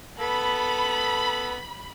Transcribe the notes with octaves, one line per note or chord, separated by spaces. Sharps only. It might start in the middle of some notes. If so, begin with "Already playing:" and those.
B3 A4 B5